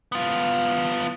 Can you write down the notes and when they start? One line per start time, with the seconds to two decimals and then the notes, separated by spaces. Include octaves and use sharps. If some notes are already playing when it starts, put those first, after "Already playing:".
0.12 B3 F4